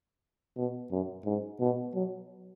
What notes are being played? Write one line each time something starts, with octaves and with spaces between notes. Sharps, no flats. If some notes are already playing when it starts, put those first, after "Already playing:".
B2
F#2
G#2
B2
F#3